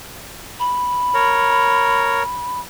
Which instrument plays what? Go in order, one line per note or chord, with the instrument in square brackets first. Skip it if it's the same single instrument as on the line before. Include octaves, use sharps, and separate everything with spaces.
[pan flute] B5
[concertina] A#4 C#5